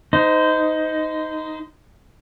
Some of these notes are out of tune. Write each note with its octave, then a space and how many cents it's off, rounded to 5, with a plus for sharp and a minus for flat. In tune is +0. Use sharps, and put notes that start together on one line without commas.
D#4 +10 C5 -30